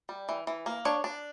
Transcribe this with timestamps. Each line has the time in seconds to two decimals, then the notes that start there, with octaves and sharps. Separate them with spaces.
0.09 G3
0.29 E3
0.47 E3
0.66 A#3
0.85 D4 C#5
1.04 D4